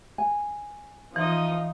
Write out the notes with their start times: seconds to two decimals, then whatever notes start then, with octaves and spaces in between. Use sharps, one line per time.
0.18 G#5
1.16 E3 F3 D#4 D#5